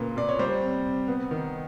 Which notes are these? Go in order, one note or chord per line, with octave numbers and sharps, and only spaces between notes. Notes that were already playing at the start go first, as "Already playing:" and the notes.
Already playing: A#2 C#3 A#3 B4
A#2 D5
C#5
G3 C5
C3
C3
B3
D#3